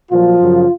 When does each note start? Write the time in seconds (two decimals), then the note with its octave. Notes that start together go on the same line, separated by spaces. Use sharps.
0.11 A#2 F3 F#3 F4
0.40 F#2 C#3 F#3